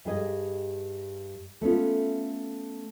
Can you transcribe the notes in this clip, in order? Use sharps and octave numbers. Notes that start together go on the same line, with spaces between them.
G2 G3 G#4 D#5
A3 B3 C#4 F4